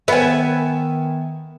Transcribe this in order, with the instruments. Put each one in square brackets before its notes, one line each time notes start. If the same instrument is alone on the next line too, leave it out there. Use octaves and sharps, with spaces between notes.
[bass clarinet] D#3 [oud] B3 [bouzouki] E5 G#5